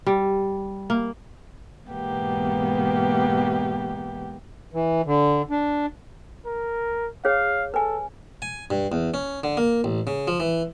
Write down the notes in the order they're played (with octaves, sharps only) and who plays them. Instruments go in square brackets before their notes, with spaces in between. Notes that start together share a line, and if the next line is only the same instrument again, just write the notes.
[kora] G3
A#3
[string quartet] G#2 B2 E3 A#3 B3 G4
[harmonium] E3
D3
D4
[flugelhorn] A#4
[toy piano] G#4 C#5 [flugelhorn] F5
[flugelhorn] A4 [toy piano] B4 G#5
[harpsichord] G#5
G2
E2
C#4
D3
A#3
A1
C#3
F3
E3